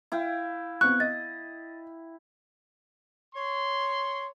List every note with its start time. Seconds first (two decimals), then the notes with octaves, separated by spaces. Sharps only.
0.12 E4 F5 G5
0.81 B3 C4 C#6 F#6
1.00 D#5 A6
3.35 C#5 C6